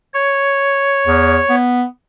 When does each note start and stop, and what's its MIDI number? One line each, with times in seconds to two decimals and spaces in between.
0.14 1.55 73
1.07 1.38 40
1.49 1.84 59